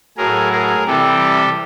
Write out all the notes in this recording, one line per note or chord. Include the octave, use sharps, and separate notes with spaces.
A2 F#3 G#4 A#4
G#4 A#4
C3 E3 G3 G4 A4